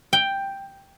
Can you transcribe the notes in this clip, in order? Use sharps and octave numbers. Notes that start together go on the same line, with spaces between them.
G5